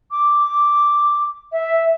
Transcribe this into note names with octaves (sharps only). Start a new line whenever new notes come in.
D6
E5